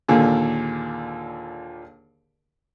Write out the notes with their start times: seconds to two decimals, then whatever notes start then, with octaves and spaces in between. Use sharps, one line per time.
0.08 D#2 A#2 D3 G#4